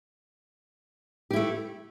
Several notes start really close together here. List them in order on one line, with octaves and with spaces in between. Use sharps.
G4 E4 A3